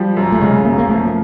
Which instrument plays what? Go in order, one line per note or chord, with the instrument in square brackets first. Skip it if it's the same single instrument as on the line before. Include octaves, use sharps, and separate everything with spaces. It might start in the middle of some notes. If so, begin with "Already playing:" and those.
Already playing: [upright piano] F3 [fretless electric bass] G3
[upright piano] F#2
[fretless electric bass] A3
[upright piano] C#3 [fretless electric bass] G#3
[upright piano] F#2 [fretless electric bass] A#3
[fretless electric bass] A#3
[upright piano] F3 [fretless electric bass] A3